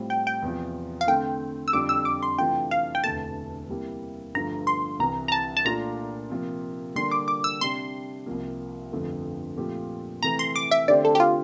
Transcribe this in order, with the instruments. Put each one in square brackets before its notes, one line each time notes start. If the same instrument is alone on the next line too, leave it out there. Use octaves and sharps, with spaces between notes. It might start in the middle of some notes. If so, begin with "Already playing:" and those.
Already playing: [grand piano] A2 G3 C4 F4 C5
[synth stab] G5
G5
[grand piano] E2 C3 F3
[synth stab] F5
[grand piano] D3 A3 C4 [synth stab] G5
[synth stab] E6
[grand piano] F2 D3 G3 D4 F4 [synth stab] D6
[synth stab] E6
D6
C6
[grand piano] C3 E3 A3 D4 F4 [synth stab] G5
[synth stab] F5
G5
[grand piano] E1 D2 C3 E3 A3 [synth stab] A5
[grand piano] C3 G3 A#3 E4 G4
[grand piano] G1 G2 D3 F3 A3 [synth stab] A#5
[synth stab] C6
[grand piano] C2 C3 E3 [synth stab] A#5
[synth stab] A#5
A5
A5
[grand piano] A#2 A3 D4 F4 [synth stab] A#5
[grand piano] C3 F3 A#3
[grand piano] D3 G3 A#3 D4 G4 [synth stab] C6
[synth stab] D6
D6
E6
[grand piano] C3 G3 D4 [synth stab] C6
[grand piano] C2 C3 F3 A#3
G1 F2 D3 F3 A3
A#2 F3 A3 C4 G4
[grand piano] C3 E3 A3 [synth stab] A#5
[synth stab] C6
D6
E5
[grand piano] D3 A3 C4 G4 C5 [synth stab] D5
[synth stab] A4
G4
F4